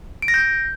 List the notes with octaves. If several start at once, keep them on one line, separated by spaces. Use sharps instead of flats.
D7
A#6
G6